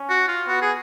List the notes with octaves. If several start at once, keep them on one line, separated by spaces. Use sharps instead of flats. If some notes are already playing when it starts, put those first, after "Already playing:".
Already playing: C#4
F#4
F4
B3 F#4
G#4